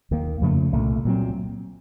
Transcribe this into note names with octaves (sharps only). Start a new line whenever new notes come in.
D#2 D#3 A#3
F2 C#3 F3 A3
C2 A#2 A3
A#2 F#3 C4